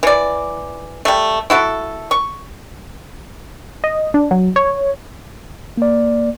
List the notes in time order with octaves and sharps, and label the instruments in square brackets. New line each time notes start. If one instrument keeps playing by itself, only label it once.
[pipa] E3 D5
G3 A3
E4 F#4 A4
C#6
[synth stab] D#5
D4
F#3
C#5
[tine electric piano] A#3 D5